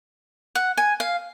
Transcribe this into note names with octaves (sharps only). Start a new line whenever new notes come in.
F#5
G#5
F5